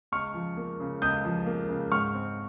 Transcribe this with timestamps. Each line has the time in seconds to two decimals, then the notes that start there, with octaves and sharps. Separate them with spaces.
0.12 C#2 C#6 F6
0.34 F3
0.57 A#3
0.80 C#3
1.02 C#2 D#6 G6
1.25 F3
1.46 A#3
1.69 C#3
1.92 G#2 C#6 F6
2.14 C4